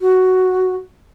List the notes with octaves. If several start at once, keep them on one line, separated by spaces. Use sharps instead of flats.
F#4